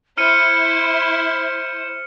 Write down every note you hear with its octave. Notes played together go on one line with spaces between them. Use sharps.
E4 C5 C6 F6 C#7 D#7